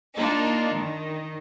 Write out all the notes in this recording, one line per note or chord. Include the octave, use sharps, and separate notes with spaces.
A#3 D4 D#4 F4
D#3